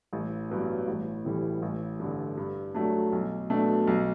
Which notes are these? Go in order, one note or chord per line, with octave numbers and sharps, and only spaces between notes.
A1
G2 F#3 B3
A1
A2 E3 G3
A1
G2 D3
G2
F#3 A3 D4
B1
B2 A3 D4
B1